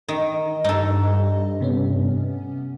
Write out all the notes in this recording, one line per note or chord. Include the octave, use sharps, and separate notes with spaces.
D#3 D#5
G2 D#4 A4
C3 B3 C#4